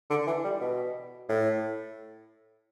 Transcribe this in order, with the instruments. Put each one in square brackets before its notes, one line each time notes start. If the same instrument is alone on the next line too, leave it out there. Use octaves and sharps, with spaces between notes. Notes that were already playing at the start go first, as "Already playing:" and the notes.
[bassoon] D3
E3
G3
B2
A2